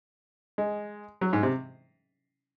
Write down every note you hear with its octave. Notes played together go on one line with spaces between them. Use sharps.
G#3
F#3
G#2
C3